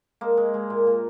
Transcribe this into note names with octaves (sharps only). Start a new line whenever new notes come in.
G#3 A#3
G#3
G#3
A#2
A#2